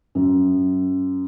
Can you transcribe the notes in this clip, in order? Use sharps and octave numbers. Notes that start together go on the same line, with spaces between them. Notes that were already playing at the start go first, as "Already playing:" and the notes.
F#2